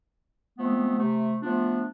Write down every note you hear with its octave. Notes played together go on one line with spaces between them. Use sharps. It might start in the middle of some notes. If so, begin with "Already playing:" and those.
F3 G#3 A3 B3 C4
C3 A3
F3 A3 B3 D4 F4